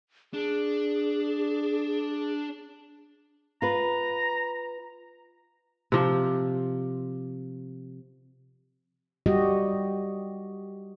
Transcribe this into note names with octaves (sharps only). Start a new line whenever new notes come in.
D4 G#4
F4 B4 A#5
C3 F3
G3 F#4 G4 D#5